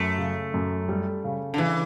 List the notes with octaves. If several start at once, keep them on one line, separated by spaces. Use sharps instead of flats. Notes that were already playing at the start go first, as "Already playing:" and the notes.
Already playing: F#2 A3
C#3
F#2
G3
C#3
D3
C#3 E3